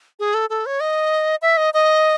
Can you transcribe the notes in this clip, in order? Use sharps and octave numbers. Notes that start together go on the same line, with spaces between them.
G#4
A4
A4
C#5
D#5
E5
D#5
D#5